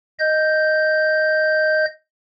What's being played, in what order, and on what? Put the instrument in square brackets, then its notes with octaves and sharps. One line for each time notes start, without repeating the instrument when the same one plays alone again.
[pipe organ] D#5 G6